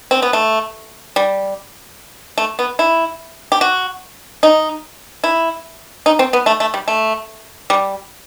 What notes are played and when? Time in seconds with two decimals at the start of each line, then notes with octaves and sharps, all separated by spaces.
0.11 C4
0.22 B3
0.33 A3
1.16 G3
2.38 A3
2.59 B3
2.79 E4
3.52 G4
3.61 F#4
4.43 D#4
5.24 E4
6.06 D#4
6.19 C4
6.33 B3
6.46 A3
6.60 A3
6.74 G3
6.88 A3
7.70 G3